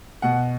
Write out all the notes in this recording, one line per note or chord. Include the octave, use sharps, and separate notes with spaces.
B2 F#5